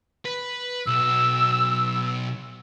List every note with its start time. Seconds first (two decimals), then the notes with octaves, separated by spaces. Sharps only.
0.25 B4
0.86 B1 E6